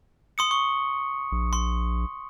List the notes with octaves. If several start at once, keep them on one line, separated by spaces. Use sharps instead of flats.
C6 D#6 C#7
C#6
A#1
C6